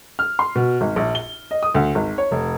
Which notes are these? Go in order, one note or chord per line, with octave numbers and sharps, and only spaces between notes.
F6
C6
B2
G#1
A#1
G7
D#5
D#6
D2
G#1
C#5
F1